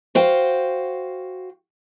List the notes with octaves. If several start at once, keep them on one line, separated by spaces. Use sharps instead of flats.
F#4 C5 F5 G5